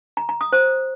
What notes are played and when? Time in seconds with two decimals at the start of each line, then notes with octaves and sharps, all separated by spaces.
0.17 A#5
0.29 A#5
0.41 D#6
0.53 C5